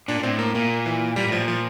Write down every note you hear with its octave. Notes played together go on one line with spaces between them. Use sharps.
A#2 D4
A#2
A2 C4
A#3
A#2 A#3
E3
A#2 G3
A2 F3
A#2
F3